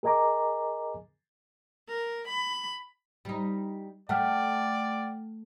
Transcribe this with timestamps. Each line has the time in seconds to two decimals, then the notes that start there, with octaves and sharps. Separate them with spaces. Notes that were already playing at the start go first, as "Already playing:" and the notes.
0.03 G#4 A#4 D#5 G#5 A#5 D6
1.88 A#4
2.28 B5
3.25 G3 D#4
4.09 A3 D5 F#5 G5 F6